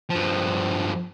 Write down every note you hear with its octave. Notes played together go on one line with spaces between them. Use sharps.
G2 F3